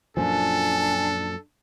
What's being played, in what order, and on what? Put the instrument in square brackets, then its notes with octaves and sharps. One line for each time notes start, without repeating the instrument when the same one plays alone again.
[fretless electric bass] F#2 A#2 F3 [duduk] D4 [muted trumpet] A4 [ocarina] G#5